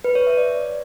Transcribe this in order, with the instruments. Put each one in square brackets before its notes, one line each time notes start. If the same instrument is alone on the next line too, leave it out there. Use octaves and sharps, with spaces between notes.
[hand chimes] B4
C#5
E5
D5